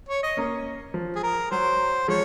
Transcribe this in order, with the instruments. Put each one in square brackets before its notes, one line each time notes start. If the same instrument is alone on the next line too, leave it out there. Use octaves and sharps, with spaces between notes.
[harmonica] C#5
D#5
[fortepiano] A#3 C#4
F3
[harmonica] G#4
A#4
[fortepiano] F#3 [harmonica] C5
[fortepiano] F3 G#3 [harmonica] C#5